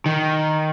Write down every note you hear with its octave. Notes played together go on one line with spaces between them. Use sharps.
D#3